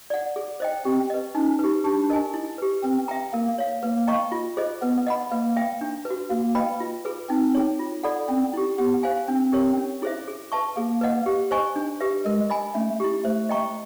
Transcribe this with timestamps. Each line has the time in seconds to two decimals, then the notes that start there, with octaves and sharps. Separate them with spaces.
0.10 D5 F#5
0.36 G#4
0.60 C5 D#5 G5
0.85 C4 G4
1.10 B4 D#5
1.35 C#4 D#4
1.59 G4 B4
1.84 D4 G4
2.10 A#4 D#5 G#5
2.34 E4
2.58 G4 B4
2.83 C4 B4
3.08 E5 G5 A#5
3.33 A#3 A#4
3.58 C#5 F5
3.83 A#3 B4
4.07 D#5 G5 A#5 C#6
4.32 F4
4.57 G#4 C5 D#5
4.82 B3 B4
5.07 D#5 F#5 B5
5.31 A#3 B4
5.56 E5 G5
5.81 D4
6.05 B4
6.10 F#4
6.30 A#3 F#4
6.55 B4 D#5 G5 B5
6.80 F4
7.05 G#4 B4
7.29 C4 D#4
7.55 G#4 C#5
7.79 F4
8.04 A4 D5 F#5 B5
8.29 C4 C#4
8.53 E4 G4
8.78 B3 G4
9.03 C5 F5 G#5
9.28 C4 D4
9.52 G4 A#4 C#5
9.78 C#4
10.02 E4 G#4 C5 E5
10.28 G#4
10.52 B4 E5 A5 C#6
10.77 A#3 G#4
11.01 B4 D#5 F#5
11.26 G4
11.51 C5 D#5 G#5 C#6
11.76 D4
12.00 G4 B4 E5
12.25 G#3 A#4
12.50 D#5 G#5 B5
12.75 A3 C#4
13.00 E4 G4
13.24 A3 C5
13.49 D#5 G5 A#5 C#6